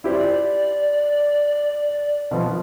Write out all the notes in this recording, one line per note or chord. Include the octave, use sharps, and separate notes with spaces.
E4 G4 C5 D5
B2 F3 B3